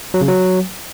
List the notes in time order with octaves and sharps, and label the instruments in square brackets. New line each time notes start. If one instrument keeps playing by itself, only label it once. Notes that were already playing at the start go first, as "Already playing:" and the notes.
[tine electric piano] F#3
C#3
F#3